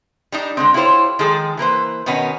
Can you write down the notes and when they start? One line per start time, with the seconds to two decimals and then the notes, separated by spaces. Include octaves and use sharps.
0.32 G3 D4 D#4
0.57 D3 G#3 C4
0.74 E4 F4 G4 A4 C5 C#5
1.19 D#3 F3 G#3 G#4 A4
1.57 E3 A#3 B4 C5
2.06 B2 D#3 B3 C#4 D#4